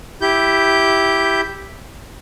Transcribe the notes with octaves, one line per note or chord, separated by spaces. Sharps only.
E4 G4 G6